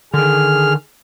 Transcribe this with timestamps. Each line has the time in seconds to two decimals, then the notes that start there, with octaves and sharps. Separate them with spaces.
0.14 D3 D#3 G#4 F6